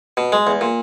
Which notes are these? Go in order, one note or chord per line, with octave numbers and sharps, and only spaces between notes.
B2
G#3
E2
A#2